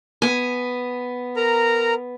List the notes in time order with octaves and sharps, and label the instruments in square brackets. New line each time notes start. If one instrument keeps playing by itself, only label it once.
[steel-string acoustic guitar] B3 G#5
[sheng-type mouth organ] A#4 A#5